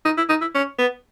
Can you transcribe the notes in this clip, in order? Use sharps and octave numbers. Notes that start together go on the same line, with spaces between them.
D#4
E4
D#4
E4
C#4
B3